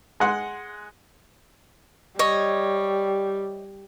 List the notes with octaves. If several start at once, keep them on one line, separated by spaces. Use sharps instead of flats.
G#3 F#5 C6
G3 C#5 D#5